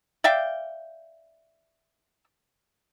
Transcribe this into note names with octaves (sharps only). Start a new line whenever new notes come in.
D5 E5 F5 G5